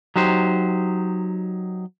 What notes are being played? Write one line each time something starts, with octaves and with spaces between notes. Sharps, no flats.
F#3 D#4 G4 C5